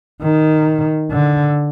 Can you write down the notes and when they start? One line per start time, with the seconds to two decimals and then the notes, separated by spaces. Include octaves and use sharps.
0.22 D#3
1.11 D3